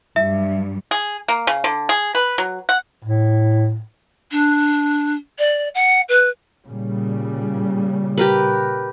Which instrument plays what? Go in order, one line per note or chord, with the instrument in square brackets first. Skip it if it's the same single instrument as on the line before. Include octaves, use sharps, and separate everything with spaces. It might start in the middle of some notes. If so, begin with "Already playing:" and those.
[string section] G2 F#3 [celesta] E5
[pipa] G#4
A#3
C#3
D3
G#4
B4
F#3
F#5
[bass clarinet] A2
[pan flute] D4
D5
F#5
B4
[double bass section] A#2 C#3 G3
[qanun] G4 A#4 B4